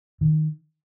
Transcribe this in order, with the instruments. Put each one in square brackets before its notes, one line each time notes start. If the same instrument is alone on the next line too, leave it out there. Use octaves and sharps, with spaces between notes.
[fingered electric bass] D#3